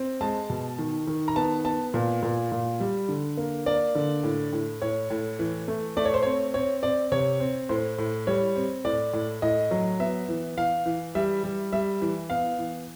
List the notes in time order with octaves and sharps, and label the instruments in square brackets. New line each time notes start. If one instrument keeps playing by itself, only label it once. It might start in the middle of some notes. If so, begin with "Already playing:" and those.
Already playing: [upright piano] C4
G#3 A5
B2
D#3
D#3
A#5
B3 A5
B3 A5
A#2
A#2
A#2
G3
D3
A#3
A#3 D5
D3
A2
A2
A2 C#5
A2
E3
A3
A3 D5
C#5
C5
C4 C#5
C4 C#5
C4 D5
C3 C#5
C4
A2 C5
A2
G3 C#5
C4
A2 D5
A2
A2 D#5
F#3
B3 E5
E3
E3 F5
E3
G3 E5
G3
G3 E5
E3
B3 F5
E3